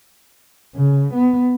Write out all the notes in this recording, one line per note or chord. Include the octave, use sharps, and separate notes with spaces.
C#3
B3